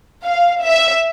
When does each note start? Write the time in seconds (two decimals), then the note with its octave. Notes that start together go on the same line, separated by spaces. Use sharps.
0.24 F5
0.63 E5